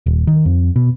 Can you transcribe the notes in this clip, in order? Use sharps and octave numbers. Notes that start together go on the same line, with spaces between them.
D#1
D#3
F2
B2